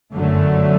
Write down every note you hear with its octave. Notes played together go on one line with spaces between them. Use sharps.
G1 F#2 D3 F#3 A3